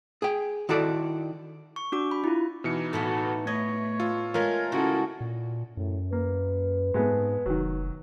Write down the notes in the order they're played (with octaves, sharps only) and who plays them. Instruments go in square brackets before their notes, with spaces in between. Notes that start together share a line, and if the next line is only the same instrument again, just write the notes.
[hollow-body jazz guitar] G#4 G5
D#3 E4 F#4 A4 D5
[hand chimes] C#6
D4 F#4 D6
B5
E4 F4
[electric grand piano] B2 E3 C#7 [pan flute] D#4
[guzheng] A2 A3 B3 [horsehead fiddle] F#4 A4
[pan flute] A3 [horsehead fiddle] C#5 [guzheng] D#5 [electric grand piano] G#6
[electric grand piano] F4 [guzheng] A4
[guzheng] G#3 A3 [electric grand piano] F4 A#4 [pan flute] C#5
[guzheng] C#3 [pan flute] E4 [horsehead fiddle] F#4 A4
[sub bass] A#2
[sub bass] F#2 [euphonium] A2
[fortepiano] A#3 [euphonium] B4
[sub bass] G#2 [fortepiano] G#3 A3 B3
[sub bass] F1 [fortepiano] D#3 F#3